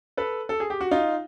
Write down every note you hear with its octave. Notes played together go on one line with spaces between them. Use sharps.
A4 B4
A4
G#4
G4
F#4
D#4 F4